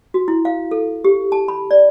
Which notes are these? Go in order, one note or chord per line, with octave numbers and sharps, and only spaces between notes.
F#4
E4
F5
A4
G4
A5
B5
D5